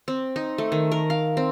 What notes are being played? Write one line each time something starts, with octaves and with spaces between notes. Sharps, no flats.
C4
D#4
A3
D#3
A#4
F5
C4